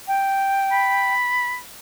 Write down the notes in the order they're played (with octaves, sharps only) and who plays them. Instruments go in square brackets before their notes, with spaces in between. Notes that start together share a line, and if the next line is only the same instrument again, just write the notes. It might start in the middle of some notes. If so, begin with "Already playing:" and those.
[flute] G5
[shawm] B5